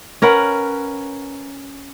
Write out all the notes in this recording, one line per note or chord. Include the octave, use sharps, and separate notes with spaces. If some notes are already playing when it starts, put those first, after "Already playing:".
C#4 A#4 B4 F#5